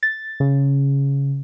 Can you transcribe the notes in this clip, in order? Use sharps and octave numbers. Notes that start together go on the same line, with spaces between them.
A6
C#3